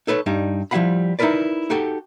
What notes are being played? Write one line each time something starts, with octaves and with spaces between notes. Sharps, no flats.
D#4 A4 B4 C#5
G2 G3 D#4
F3 G3 E4 F5 F#5 B5
D#4 E4 F#4 A#4 B4 D5
D#4 F#4 G4 A4